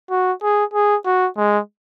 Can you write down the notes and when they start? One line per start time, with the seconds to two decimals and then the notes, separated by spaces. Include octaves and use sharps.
0.10 F#4
0.43 G#4
0.74 G#4
1.05 F#4
1.37 G#3